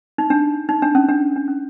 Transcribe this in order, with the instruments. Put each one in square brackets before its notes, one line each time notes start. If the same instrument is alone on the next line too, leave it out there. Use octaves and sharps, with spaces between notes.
[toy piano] D#4
D4
D#4
D4
C#4
D4
D4
C#4